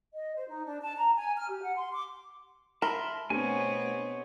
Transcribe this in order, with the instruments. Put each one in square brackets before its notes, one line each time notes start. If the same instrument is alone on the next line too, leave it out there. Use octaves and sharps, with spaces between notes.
[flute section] D#5
C5
D#4
D4
A5
A#5
G#5
F6
G4
F#5
C6
D6
[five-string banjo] A#4 [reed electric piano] E5 [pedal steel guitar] A5 B5 C6
[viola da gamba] B2 B3 C4 [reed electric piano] A3 D4 G4 [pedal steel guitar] C#5 G#5